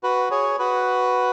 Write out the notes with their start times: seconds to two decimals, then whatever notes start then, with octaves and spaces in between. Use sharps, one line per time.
0.03 F#4 B4
0.31 G#4 C#5
0.59 F#4 B4